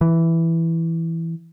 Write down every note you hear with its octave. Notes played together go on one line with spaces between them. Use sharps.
E3